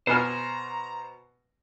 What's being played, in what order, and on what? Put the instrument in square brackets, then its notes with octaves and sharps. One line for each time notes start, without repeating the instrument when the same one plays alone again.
[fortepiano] B2 B4 G#5 [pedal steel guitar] C5 F6 [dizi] A#5